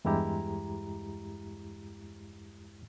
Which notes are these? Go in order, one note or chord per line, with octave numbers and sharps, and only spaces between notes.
E2 G2 G#3 E4 G4 A#5